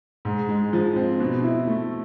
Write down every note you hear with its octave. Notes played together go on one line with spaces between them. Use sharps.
G#2
G#3
F3
C4
B2
E4
A3